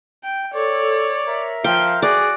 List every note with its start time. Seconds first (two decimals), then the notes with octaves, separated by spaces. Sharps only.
0.23 G5
0.54 A4 C#5 D5
1.26 A#4 E5 A#5
1.64 F3 F5 G5
2.02 F#4 G#4 D5